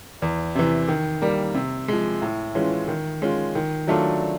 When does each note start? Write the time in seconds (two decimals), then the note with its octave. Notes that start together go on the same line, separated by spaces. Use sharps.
0.22 E2
0.55 C3 E3
0.88 D#3
1.22 G3 A#3
1.55 C3
1.88 F3 G#3
2.22 A2
2.55 E3 G#3 C#4 F4
2.88 D#3
3.22 G#3 C#4 F4
3.55 D#3
3.88 F#3 A3 D4 F4